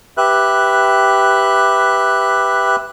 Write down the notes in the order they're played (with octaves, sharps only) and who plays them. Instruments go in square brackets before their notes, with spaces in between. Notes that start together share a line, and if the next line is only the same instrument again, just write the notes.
[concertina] G4 B4 E5 F#6